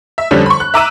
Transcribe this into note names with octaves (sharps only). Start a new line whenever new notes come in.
E5
F2 D3 G3 C#4 D4
B5 C#6
F#6
E5 A#5 D6 E6 F#6 D#7